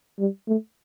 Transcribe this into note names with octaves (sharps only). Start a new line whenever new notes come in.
G3
A3